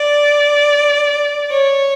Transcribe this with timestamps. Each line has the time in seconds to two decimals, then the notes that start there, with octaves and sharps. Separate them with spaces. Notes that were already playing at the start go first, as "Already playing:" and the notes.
Already playing: D5
1.51 C#5